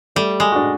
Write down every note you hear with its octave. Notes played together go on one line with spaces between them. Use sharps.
G3 A3
G#3
D4 F#4